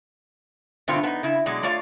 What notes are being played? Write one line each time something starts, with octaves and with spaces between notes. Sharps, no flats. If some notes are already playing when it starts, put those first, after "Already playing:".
G2 B2 D3 A3 C4 F4
B3 C#4 D#4
C#3 E4
B2 F#3 G#3 D5
A3 F4 C#5 D5 F5